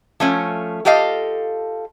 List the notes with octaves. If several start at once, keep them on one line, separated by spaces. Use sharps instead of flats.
F3 A3 C#4
F4 G4 A4 D#5 F5